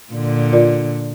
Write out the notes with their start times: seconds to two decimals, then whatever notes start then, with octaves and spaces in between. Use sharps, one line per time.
0.13 A#2 D3
0.53 F4 A#4 D5